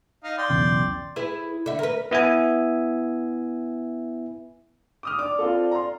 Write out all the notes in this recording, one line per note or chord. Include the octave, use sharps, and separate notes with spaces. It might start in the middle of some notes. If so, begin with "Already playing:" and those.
D#4 F5
D5 G5 C6
B1 E2 C#3
E4 G#4 B4
D3 E5
A#4 B4
B3 E4 E5 G#5
D6 D#6 F6
D5 D6
C4 F4 A4
A#5 C6